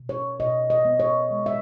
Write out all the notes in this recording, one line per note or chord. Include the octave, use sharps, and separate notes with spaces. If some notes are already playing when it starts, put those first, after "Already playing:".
Already playing: B2
C#5
B2 D#5
D#5
B3
C#5
G#3
E5